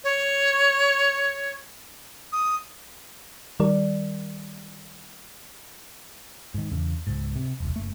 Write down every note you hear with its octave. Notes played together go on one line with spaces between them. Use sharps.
C#5
D#6
D#3 G3 A#4 D5
G#2 D#3
E2 C#3
C#2 G#2
C3
E1 C2
F#1 A3